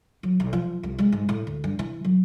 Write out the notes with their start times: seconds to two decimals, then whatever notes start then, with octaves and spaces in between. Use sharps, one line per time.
0.23 F#3
0.40 B1
0.53 F3
0.83 C2
0.98 G#3
1.12 G#2
1.29 A2
1.47 D2
1.64 G2
1.79 E3
2.05 F#3